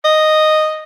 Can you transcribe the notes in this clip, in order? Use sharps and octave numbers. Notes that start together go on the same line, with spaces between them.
D#5